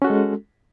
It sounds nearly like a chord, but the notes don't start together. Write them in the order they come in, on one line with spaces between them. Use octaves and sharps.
C#4 F#4 A4 G#3